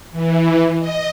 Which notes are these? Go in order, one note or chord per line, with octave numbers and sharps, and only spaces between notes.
E3
D#5